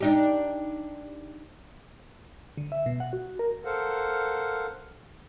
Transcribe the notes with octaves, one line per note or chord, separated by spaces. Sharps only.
D4 D#4 G4
D3
E5
B2
F#5
F#4
A#4
A4 A#4 C5 F5 F#5